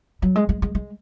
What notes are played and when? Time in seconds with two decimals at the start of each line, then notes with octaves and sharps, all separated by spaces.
0.22 F#3
0.36 G#3
0.49 G#3
0.62 G#3
0.75 G#3